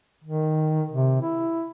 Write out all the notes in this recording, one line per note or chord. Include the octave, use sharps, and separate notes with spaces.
D#3
C3
E4